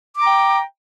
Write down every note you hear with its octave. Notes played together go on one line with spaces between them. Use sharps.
G5 A#5 D6